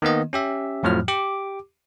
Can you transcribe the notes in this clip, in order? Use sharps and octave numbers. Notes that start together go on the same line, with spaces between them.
D#3 A#3 B3 D#5
C#4 G4 E5
F2 A2 F3 F#3 F6
G4 D6